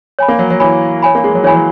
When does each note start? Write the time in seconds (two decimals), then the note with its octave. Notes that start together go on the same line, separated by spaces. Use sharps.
0.19 C#5 G#5 B5
0.28 A#3
0.39 F#3
0.50 F#3
0.60 E3 C#5 G#5 B5
1.03 C#5 G#5 B5
1.15 A#3
1.24 G#3
1.35 F#3
1.44 E3 C#5 G#5 B5
1.55 F#3